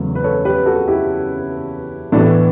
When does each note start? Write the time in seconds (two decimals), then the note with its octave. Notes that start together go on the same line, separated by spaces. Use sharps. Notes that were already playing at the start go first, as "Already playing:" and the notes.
Already playing: E2 C#3 F#3 A3 B4
0.15 B4
0.24 A4 C#5
0.45 G4 B4
0.66 F#4 A4
0.87 E4 G4
2.12 A2 E3 A3 B3 D4